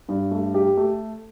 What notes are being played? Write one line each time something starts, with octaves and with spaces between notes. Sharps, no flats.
G2
A3
G4
A3